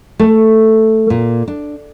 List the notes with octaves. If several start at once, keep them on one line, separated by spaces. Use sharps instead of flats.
A3
A#2
D4